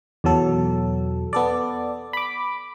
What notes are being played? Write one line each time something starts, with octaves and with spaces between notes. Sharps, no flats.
E2 B2 F#3 A4
B3 A4 D5
B5 D6